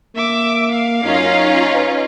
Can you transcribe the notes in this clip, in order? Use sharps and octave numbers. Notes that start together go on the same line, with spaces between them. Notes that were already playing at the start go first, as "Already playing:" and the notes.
A#3 E5 D6
F5
F#2 C#4 D#4 F4
B4